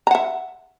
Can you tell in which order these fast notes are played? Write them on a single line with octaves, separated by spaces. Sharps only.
A#5 F#5 E5